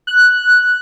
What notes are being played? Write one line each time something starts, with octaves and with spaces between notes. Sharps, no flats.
F#6